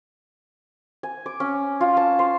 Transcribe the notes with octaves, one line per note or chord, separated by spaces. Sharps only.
G#5
D6
C#4
F4
A5
C6